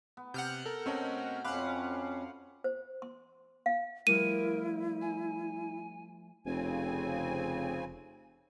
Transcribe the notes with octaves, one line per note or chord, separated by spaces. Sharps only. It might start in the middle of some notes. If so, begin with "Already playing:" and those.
B3
C3 F#5 F6 G6
A4 A#4
B2 A3 C4 C#4 A#4 D#5
F2 C#4 C5 F5 F#5 B5 D6 F#6
C5
C6
F5
F3 G3 A3 E4 A#4 D#7
G#5
F1 C#3 C4 G#5